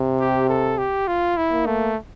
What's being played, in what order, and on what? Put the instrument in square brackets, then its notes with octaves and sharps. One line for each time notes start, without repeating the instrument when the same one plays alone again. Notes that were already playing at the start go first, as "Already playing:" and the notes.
Already playing: [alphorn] C3
[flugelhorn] G4
A4
G4
F4
E4
[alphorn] A#3
[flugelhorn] A3